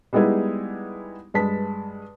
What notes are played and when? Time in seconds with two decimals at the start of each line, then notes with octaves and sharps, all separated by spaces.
0.13 G3 G#3 B3 D#4 E4 G#4
1.34 G2 G#3 B4 A5 B6